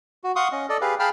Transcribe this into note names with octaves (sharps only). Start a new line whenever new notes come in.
F#4
F5 F#5 C6 C#6 D#6
C#4 D#5
A4 D5 D#5
G4 G#4 B4 F5
G#4 F5 G5 A5 B5 F6